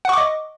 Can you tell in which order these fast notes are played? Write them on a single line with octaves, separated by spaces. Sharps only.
F#5 C#6 D6 D#5